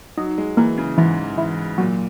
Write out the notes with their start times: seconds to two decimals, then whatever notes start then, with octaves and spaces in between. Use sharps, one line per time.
0.18 F#3 D#4
0.38 G#3
0.57 E3 A#3
0.78 C#3
0.98 G#2 E3
1.38 E3
1.78 A#2 F#3